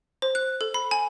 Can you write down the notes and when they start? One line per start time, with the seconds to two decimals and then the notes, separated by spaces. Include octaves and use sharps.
0.22 C5
0.35 F#6
0.61 A4
0.74 B5
0.91 G#5